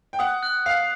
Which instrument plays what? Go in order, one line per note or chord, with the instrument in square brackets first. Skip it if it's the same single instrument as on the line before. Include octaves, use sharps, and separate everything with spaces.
[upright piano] G5
[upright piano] F#5 [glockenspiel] D#6
[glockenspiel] F#6
[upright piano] F5 [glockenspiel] C7